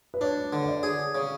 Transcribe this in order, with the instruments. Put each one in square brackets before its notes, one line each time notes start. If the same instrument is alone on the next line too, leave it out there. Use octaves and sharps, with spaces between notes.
[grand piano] B4
[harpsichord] D4 [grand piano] C#5
[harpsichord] D3
[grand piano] C#5
D5
[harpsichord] G#4
C#3